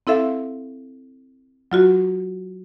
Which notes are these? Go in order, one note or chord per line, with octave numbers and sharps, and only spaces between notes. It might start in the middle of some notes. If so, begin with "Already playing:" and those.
C4 E4 A4 E5 F5
F#3 F4 F#4